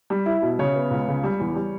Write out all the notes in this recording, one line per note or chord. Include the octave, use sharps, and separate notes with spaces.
G3
E4
B2
C#3 C#5
B3
C#2
C#3
G3
E2
G3